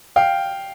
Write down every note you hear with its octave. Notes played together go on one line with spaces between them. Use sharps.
F5 G5